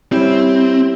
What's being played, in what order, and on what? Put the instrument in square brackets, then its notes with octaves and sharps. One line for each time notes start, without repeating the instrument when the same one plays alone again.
[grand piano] G3 C#4 E4 [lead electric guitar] C4